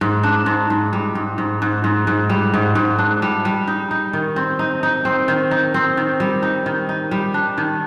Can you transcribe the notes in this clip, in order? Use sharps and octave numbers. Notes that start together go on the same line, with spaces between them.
G#2
D4
G#2
G#2
G3
G#2
G#2
G#2
G#2
G#2
G3
G#2
G#2
D4
G3
G3
D#4
D#4
D#3
C4
D#4
D#4
C4
D#3
D#4
C4
D#3
G3
D#4
D#3
D#4
G3
D4
D#3